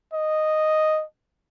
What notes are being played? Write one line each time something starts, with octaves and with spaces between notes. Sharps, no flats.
D#5